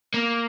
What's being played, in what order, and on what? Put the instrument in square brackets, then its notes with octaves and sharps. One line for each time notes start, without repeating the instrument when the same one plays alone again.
[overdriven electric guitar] A#3